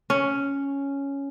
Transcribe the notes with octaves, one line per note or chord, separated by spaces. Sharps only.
C#4